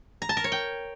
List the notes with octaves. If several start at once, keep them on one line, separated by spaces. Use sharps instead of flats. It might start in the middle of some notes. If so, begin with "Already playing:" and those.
A#5
A5
A#4
C#5
G5